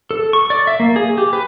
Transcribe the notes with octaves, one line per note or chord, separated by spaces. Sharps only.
A4
C#6
D5
E5
A#3
G#4
G4
B4